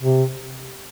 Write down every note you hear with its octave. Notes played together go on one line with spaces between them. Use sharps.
C3